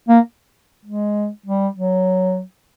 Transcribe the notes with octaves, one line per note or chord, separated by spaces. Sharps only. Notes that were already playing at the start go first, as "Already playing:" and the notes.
A#3
G#3
G3
F#3